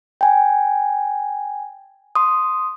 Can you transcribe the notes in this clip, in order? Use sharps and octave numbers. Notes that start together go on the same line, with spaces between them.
G5 G#5
C6 D#6